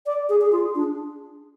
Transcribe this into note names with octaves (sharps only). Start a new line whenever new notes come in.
D5
G#4
G#4
F4
D4